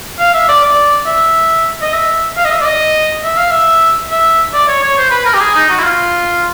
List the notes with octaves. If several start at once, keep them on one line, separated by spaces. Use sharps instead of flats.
F5
E5
D5
D5
E5
D#5
E5
F5
D#5
E5
D5
D#5
E5
F5
E5
E5
D5
C#5
C#5
C5
B4
A#4
G4
G#4
D#4
F#4
E4
F4